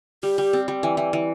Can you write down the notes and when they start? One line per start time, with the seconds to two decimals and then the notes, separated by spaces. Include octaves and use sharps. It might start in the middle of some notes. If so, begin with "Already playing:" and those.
0.23 G3 G4
0.38 G3
0.53 C4
0.68 G3
0.83 E3
0.97 E3
1.13 E3